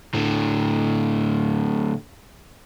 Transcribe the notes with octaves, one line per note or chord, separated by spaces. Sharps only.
A2 D3